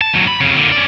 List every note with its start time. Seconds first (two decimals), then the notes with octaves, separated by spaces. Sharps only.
0.01 A5
0.14 D#2 F#3
0.28 B5
0.41 F2 C#3
0.55 A#2 D3
0.72 C#4 D5